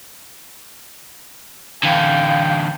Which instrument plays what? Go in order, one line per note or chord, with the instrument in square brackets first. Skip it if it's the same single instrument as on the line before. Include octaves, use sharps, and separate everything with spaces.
[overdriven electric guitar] D3 E3 [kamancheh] F5 [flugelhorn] G5